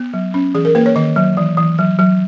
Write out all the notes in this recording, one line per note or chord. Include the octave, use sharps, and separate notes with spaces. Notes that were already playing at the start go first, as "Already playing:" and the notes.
Already playing: B3
F#3
C#4
E3 G#4
A#4
A#3 B4
C#5
D#3 D#5
F#3
E3
E3
F#3
F#3